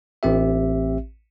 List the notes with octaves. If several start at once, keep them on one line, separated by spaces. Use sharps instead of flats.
A1 C4 G4 E5